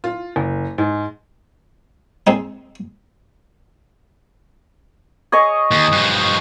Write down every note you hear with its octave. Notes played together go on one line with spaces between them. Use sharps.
F4
F#1
G#2
G#3 C4 D#4
G#4 C#5 D#5
D#2
G2 F3